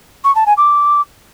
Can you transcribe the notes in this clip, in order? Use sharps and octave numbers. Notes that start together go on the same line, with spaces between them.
C#6
A5
G#5
D6